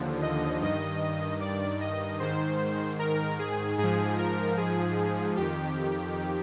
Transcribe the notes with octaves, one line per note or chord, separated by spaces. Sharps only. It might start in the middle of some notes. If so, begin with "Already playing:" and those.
Already playing: D#2 D3 F3
D#5
G2 D#3 D#5
D5
D#5
G#2 D#3 C5
A#4
G#4
G#2 F3 G#4
A#4
G#4
F2 D#3 G4